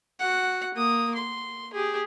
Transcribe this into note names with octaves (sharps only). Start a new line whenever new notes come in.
F#4 F#5
A#3 D#6
C6
G4 G#4